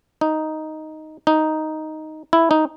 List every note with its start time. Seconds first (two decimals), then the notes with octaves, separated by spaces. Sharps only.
0.21 D#4
1.27 D#4
2.33 E4
2.51 D#4